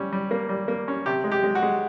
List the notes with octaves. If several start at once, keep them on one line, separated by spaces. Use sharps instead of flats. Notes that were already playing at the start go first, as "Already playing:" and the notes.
Already playing: G3 C#4
G3
A#3
G3
A#3
C#4
C3 G4
G#3
G4
G#3
F#4
G#3